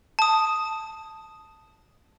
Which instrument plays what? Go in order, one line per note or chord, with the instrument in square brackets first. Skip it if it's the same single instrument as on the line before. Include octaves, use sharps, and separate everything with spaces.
[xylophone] A5 D#6